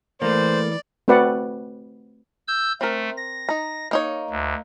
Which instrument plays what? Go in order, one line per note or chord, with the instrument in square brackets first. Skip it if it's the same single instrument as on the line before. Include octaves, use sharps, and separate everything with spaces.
[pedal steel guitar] E3 [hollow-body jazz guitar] A3 A#3 [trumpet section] C5 [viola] D5
[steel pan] A3 C4 F#4 B4 D5 F#5
[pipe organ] E6 G6
[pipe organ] A3 [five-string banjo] C4 A#4
[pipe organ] A#6
[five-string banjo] D#4 A#5
A#3 D#4 C#5
[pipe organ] D2